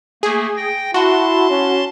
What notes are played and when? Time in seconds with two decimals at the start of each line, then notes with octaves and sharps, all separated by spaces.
0.23 A3 A#3 G#4
0.57 G5 A#6
0.94 E4 F#4 A5 C6
1.50 C#4